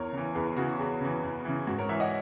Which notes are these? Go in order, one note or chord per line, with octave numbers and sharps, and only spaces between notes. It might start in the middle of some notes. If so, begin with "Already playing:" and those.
Already playing: E2 A#4 C#5
C#3 E3
E2 G#4 B4
C#3 E3 F#4
E2 G#4
C#3 E3
E2
C#3 E3
G#2 F#4
A#4 C#5
E3 C#5 E5
D#5 F#5